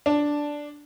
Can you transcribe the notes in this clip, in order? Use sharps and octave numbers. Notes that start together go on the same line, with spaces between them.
D4